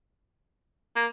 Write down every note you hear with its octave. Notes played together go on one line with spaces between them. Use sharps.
A#3